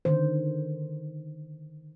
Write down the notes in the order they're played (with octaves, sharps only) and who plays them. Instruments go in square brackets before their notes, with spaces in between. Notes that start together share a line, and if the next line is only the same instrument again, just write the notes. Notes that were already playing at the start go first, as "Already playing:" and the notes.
[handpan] D3 D#3 C5